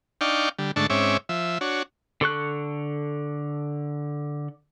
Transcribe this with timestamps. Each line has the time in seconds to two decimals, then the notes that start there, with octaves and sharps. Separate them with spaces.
0.21 D4 D#4 D5 F5 G5 C#6
0.58 D3 G3
0.76 G#2 D3 A3 D4 A5 C#6
0.90 G#2 C4 C#4 C#5 E5 D6
1.29 F3 E5
1.61 D4 F#4 C#5
2.21 D3 A4 C#6 F#6